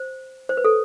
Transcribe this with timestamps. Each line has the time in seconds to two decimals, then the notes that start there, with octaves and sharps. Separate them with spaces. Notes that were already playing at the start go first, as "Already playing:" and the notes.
Already playing: C5
0.49 C5
0.57 B4
0.64 A4